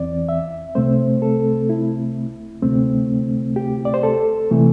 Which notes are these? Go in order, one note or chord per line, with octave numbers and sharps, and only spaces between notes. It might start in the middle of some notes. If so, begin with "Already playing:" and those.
Already playing: E2 E3 C4 D5
E5
C2 C3 A3 C4 C5
A4
E4
D2 C3 A3 C4
G4
D5
C5
A4
C3 E3 A3